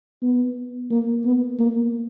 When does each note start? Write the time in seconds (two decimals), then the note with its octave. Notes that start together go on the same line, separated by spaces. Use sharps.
0.22 B3
0.91 A#3
1.25 B3
1.59 A#3